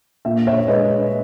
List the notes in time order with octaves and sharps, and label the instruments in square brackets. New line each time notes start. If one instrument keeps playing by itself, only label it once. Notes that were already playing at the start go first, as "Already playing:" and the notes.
[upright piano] A#2 E5
C#5 E5
G#3 B4 D#5